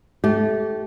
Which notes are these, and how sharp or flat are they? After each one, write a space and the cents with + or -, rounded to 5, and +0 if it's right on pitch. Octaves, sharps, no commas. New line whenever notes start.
A3 -20 G4 -30